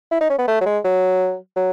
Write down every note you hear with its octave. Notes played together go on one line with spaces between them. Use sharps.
E4
D#4
C#4
B3
A3
F#3
G#3
F#3
F#3